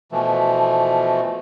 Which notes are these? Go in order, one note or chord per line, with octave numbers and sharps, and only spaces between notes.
B2 E3 F3 A3